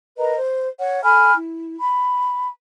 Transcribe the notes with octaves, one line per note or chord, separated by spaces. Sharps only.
A#4 B4 D#5 A#5
C5
C#5 F#5
A4 G#5 B5 F6
E4
B5